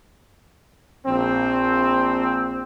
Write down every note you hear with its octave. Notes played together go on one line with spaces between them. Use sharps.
A#1 C4